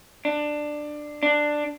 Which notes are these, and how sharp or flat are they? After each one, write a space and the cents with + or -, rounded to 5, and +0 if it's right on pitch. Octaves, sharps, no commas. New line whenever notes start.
D4 +15
D4 +10